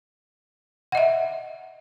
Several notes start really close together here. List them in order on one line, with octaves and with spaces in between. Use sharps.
F#5 D#5 E5